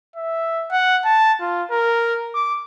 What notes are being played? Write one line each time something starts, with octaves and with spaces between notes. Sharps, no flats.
E5
F#5
A5
F4
A#4
D6